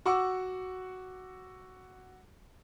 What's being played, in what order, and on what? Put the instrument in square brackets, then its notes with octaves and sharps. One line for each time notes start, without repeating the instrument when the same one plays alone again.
[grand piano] F#4 F#5 C#6 D6 E6